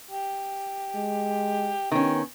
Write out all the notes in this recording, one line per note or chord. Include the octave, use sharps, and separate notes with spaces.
G4
G#3
D#3 B3 C#4 G4